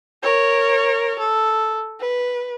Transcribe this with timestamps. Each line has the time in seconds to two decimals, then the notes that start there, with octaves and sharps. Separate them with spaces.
0.23 A#4 C#5
1.19 A4
2.00 B4